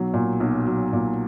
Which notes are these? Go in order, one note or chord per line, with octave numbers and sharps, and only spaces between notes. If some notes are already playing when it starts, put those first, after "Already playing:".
Already playing: B1 F#3
A#2
B1
F#3
A#2